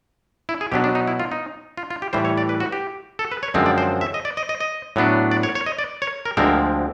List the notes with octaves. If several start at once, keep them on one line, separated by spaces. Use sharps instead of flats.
E4
G#4
B2 F#3 B3 D4 G4
D4
D#4
E4
F4
D#4
F4
F4
G4
A2 E3 G3 C5
C#5
D5
B4
F#4
G4
A4
B4
C#5
F#2 D3 F3 G#3 C4
D5
C5
E5
D#5
D5
D#5
D#5
D#5
A2 F#3 B3 D4
D5
C#5
C#5
D#5
D5
C#5
A#4
D2 D3 F3 G#3 C4 A#4